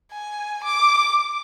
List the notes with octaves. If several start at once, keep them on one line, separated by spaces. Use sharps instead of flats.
G#5
D6